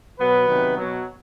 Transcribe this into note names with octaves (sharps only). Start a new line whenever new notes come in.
B2 F#3 B3 B4
C3 D#3 F#3
B2 F#3